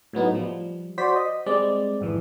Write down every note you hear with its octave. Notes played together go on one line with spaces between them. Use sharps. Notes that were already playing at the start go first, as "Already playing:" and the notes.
A2 F#3 B3 D#4
F3 G3
F#4 C5 D5 B6
D#5
G3 G#3 C4 D5
G#1 F2 E3